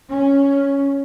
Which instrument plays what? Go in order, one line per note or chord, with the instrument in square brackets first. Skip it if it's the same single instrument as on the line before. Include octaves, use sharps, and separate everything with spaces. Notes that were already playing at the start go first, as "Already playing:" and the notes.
[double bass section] C#4